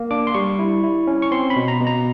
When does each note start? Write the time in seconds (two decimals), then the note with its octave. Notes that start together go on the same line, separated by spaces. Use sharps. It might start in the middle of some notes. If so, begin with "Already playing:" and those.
Already playing: A#3
0.11 D4 D6
0.27 C6
0.34 G3 C#6
0.59 E4
0.84 E4
1.07 C#4
1.22 C#6
1.31 C4 C6
1.50 B5
1.56 B2
1.68 A#5
1.81 B2
1.87 A#5